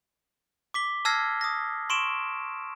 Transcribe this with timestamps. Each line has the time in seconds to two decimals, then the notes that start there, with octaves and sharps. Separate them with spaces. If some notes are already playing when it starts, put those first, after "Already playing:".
0.74 D6 B6 G7
1.05 A5 E6 F6 G#6 A#6 C7
1.41 D#6 A#6
1.90 C6 C#6 D7 E7